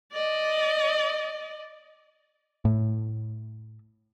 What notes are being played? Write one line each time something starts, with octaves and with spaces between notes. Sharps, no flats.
D5 D#5
A2